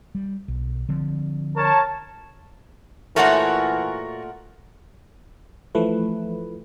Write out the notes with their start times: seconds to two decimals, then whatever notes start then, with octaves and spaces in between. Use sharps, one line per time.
0.15 G3
0.48 B1
0.89 D3 F3 C4
1.57 A#4 C#5 A5
3.16 A#2 E3 A3 F4 F#4 A#4 C#5 F#5
5.75 E3 F3 A3 B4